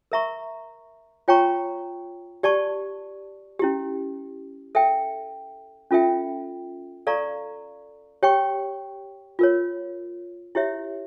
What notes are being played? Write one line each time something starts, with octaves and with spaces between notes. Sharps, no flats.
A#4 E5 A#5 C#6
F4 C#5 G5 A#5 C#6
G4 D5 A5 C#6
C#4 E4 G4
A4 E5 G5
C#4 F4 A4 E5 G5
A4 D5 F5 A#5 C#6
G4 C#5 G5 C#6
F4 A#4 C#5
E4 G4 C#5 E5